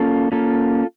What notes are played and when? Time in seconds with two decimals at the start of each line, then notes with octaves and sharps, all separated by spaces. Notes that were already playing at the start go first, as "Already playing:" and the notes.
Already playing: A#3 C#4 F4 A4
0.32 A#3 C#4 F4 A4